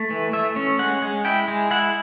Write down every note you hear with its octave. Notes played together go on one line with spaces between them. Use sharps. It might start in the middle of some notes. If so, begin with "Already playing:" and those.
Already playing: A3
E3
A3 E5
C#4
G#3 F#5
G#3
E4 G5
G#3
E4 F#5